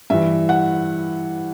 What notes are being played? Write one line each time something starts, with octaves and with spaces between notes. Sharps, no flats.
G2 E3 E5
F#5